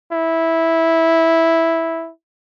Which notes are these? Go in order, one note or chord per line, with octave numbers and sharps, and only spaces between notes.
E4